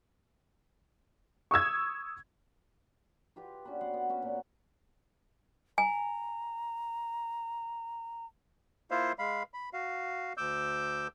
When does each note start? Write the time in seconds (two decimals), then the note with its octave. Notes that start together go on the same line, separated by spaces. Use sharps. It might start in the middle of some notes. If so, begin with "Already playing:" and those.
1.51 C#6 D#6 E6 G#6
3.36 F4 G4 B4 F5
3.65 C#4 D4 F#4 B4
3.81 B3 F#5 C6
3.94 B3
4.09 C#4 F#4 B4 F#5
4.22 A#2
5.78 G#5 A#5
8.91 A#3 E4 F4 C5 E5 F5
9.19 G#3 F5 B5
9.54 B5
9.73 F#4 F5
10.37 D2 D6 E6 G6